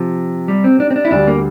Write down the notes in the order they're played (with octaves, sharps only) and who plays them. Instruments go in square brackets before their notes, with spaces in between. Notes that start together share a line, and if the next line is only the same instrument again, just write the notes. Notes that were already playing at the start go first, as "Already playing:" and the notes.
Already playing: [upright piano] C3 [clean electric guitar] F3
[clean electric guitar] G3
C4
D4
C4
D4
E4
[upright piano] D2 D3 G3 [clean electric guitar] D4
[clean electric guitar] A#3